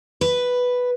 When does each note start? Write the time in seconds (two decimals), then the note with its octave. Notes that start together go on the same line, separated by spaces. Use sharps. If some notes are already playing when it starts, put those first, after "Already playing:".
0.21 B4